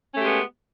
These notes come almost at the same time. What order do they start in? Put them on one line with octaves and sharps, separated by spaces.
C#4 A3 G4 G#3 B3